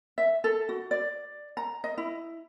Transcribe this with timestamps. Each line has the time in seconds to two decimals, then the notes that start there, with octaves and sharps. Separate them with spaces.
0.18 E5
0.44 A4
0.69 F#4
0.91 D5
1.57 A#5
1.84 D#5
1.98 E4